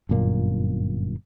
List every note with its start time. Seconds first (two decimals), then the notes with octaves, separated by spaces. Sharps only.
0.09 G1 F#2 A#2 A#3